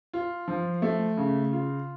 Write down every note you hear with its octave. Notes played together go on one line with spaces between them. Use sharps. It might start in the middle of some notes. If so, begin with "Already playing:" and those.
F4
F3
A3
C#3
F4